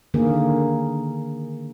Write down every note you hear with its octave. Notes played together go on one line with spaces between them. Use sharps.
D3 D#3 A#3 G#4